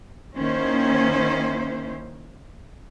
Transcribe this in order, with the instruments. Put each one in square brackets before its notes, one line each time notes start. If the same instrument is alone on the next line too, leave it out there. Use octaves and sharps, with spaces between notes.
[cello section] D#3 A#3 C#4 E4 C5